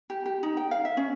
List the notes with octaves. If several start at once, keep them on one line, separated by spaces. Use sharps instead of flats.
G4
G4
D#4
G5
F5
E5
C#4